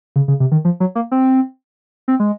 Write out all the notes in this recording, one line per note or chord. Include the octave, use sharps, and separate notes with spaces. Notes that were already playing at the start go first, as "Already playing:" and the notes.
C#3
C#3
C3
D#3
F3
F#3
A#3
C4
C4
G#3